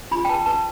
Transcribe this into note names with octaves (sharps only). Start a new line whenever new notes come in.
F4 B5
G5
B4 A5
B4 A5